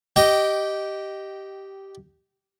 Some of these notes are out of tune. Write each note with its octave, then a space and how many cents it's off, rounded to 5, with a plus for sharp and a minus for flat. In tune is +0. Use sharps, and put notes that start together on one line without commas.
G4 -10 D#5 +0 G5 -20